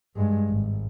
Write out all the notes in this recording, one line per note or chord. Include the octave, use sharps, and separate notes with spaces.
G2 G#3
G#1